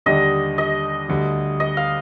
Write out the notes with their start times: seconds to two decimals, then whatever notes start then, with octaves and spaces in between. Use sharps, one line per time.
0.06 D#2 D3 G3 D4 G4 D#5
0.58 D#5
1.09 D2 D3 G3
1.60 D#5
1.77 F5